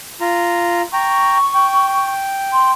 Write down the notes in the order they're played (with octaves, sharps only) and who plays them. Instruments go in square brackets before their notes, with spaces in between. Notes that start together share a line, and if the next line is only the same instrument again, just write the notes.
[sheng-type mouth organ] F4 A#5
[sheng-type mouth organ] G5 A#5 [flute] C#6
[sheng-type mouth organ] G5
[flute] C6